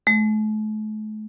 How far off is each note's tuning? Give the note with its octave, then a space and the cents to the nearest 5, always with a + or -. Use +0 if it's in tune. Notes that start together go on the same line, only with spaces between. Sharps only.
A3 -40